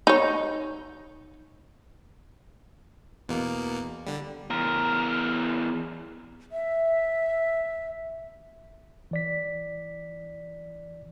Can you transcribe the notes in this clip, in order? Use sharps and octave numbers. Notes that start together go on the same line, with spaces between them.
D#4 C#5
E2 B2 A#3
D3 G3
E2 A#4
E5
E3 D5 B6